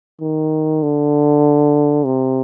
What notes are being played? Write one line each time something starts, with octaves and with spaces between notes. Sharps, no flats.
D#3
D3
C3